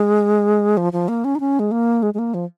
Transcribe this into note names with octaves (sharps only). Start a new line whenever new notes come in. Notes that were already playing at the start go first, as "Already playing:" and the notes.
Already playing: G#3
F3
F3
A#3
C#4
D#4
C#4
G#3
A#3
G#3
G#3
A#3
F3